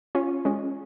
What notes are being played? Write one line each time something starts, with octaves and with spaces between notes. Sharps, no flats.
C#4 F4
G#3 C#4